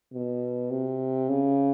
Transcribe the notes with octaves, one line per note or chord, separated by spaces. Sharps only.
B2
C3
C#3